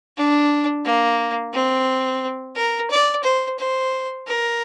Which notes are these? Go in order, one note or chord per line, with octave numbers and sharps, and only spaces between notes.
D4
A#3
C4
A#4
D5
C5
C5
A#4